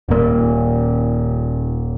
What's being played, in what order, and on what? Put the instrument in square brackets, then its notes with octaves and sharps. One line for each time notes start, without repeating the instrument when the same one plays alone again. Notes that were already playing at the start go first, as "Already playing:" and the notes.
[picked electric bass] D#1 A#2